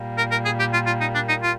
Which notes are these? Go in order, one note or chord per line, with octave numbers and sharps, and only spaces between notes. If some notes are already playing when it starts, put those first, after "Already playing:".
Already playing: A#2 G3 A#3
A#4
A#4
G#4
G4
F4
F4
D#4
D4
D#4
F4